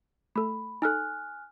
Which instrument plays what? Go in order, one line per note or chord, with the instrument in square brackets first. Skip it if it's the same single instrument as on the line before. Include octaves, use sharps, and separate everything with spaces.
[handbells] A3 A4 [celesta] B5
[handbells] D#4 A4 [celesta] G#5 F6 F#6